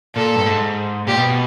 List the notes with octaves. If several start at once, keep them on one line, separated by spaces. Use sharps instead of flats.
A#2 A4
G2
G#2
A#2 G4
B2
B2